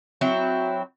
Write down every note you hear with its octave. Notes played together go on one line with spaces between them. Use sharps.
F#3 C4 E4